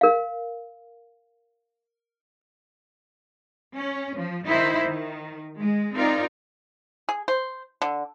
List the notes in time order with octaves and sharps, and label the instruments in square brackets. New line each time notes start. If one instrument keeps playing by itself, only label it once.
[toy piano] A#4 F5
[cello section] C#4
F3
D#3 D#4 E4 C5
D#3
G#3
C4 D#4 F4 A#4 D5
[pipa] G#4
C5
D3